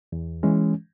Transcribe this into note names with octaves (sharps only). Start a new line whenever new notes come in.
E2
E3 G#3 C#4